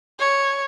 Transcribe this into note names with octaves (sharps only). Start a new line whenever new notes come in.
C#5